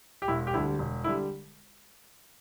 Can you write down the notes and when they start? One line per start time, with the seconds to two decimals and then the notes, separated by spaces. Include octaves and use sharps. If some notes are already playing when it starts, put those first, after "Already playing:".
0.22 G4
0.28 E1 E4
0.47 G4
0.54 D2 D3 G3 E4
0.79 E1
1.04 D3 G3 E4